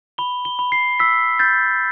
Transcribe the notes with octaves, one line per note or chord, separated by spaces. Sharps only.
B5 G7
G7
B5
C7
E6 B6
G6 A6